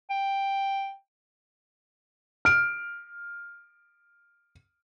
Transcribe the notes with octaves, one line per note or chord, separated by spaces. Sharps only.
G5
F6 D7